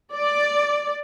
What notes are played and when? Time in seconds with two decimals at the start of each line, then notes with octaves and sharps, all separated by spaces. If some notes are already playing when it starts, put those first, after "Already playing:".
0.14 D5